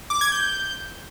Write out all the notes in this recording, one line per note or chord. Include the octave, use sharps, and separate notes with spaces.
D6
G#6
G6